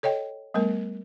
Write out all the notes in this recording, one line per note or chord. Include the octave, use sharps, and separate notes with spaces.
A4 C#5 D#5 G5
G3 A3 B3 A#4